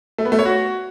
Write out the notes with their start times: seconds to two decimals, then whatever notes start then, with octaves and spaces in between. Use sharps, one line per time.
0.18 A3
0.25 B3
0.32 A3
0.39 C#5
0.45 F#4